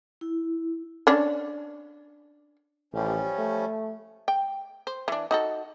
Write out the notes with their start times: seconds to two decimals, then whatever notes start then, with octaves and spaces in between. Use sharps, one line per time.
0.21 E4
1.07 C#4 D4
2.94 A1 F3 G3 C#4
3.38 A3
4.28 G5
4.87 C5
5.08 E3 D4
5.31 D#4 F#4 A4